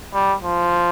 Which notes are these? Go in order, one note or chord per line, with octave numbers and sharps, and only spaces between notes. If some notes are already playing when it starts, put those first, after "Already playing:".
G3
F3